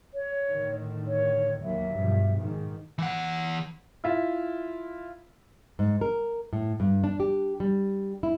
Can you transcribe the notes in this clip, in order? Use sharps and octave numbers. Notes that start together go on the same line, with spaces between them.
C#5
A2 D3 D#3
C#5
D#2 F#3 A#3 E5
G2 B2 F3
G#2 D#3
E3 F#5
E4 F4 E5
G#2
A#4
A2
G2
D4
G4
G3
E4